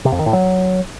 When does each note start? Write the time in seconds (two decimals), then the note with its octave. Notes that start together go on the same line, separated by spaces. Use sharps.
0.05 C3
0.12 F2
0.19 D#3
0.26 A2
0.33 F#3